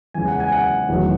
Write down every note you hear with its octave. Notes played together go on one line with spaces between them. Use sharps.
E2 C#3 G#3 G#5
F#5
G#5
F#5
E1 E2 D#3 F#3 A3